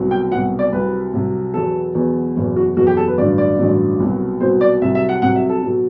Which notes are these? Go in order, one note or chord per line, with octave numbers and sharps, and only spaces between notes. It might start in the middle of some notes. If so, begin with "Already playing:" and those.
Already playing: C2 B2 F#3
G5
C2 B2 F#3 F#5
D5
C2 C3 F#3 B4
C2 C3 F#3
E2 B2 F#3 A4
E2 B2 F#3
F#1 E2 B2
F#4
F#1 E2 B2 F#4
G4
A4
B4
A1 G2 D3 F#3 D5
D5
A1 G2 D3 F#3
C2 B2 F#3
C2 B2 F#3 C5
D5
C2 C3 F#3 E5
E5
F#5
C2 C3 F#3 F#5
E5
A4
B2 F#3